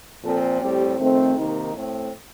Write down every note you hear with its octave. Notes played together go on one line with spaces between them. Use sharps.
A#2 F3 C4 A4
A2 G3 C4 G4
F2 D#3 A3 C4
C3 D#3 A#3 D#4
A2 A3 C4